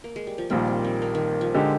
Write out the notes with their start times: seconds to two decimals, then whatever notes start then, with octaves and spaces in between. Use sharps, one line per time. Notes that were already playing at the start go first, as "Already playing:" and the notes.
0.04 A#3
0.16 G#3
0.27 G3
0.38 F3
0.50 A#1 A#2 D#3 G3
0.68 C4
0.84 C4
1.02 A#3
1.15 D#3
1.41 F3
1.54 D3 G#3 D#4 G4